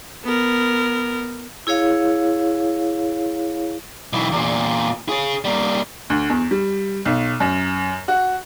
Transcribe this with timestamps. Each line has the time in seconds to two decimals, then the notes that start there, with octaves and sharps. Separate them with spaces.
0.24 B3 A#4
1.67 E4 G#4 C#5 F5
4.13 B1 E3
4.32 E2 A#2
5.09 G#4 C#5
5.45 G3 A#3
6.10 D2
6.30 E2
6.51 G3
7.05 B1
7.40 F#2
8.08 F#4